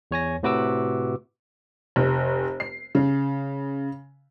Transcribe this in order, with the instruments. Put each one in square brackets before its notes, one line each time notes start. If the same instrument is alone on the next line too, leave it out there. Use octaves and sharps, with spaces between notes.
[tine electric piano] E2 C#5 G#5 A#6
A2 C3 F#4 B4 D6 E6
[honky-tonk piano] F1
C7
C#3